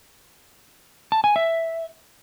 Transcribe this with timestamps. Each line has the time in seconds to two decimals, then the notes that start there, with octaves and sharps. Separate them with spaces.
1.12 A5
1.24 G#5
1.36 E5